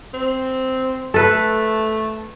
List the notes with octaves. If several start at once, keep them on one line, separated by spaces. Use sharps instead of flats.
C4
A3 A4 B4